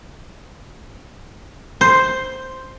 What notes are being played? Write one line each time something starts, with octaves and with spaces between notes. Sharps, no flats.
C5